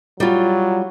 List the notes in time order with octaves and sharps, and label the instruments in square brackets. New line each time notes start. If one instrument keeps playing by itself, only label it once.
[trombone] F#3 [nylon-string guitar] G3 F4